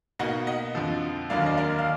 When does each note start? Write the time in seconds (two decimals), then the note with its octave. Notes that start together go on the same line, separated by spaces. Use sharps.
0.19 B2 A#3 D#4 D#5 F#5
0.47 D#5 F#5
0.75 F2 D3 F3
1.30 D#2 D3 F#3 A#3 D5 F5
1.46 D#5
1.57 A#4 D5
1.79 F5